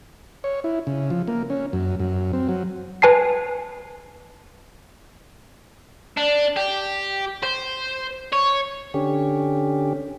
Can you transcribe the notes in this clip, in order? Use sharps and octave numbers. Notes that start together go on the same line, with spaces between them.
C#5
E4
C#3
F3
A#3
C#4
F#2
F#2
C4
F#3
B4 G#5 A5 C7
D4
G4
C5
C#5
D3 C#4 G4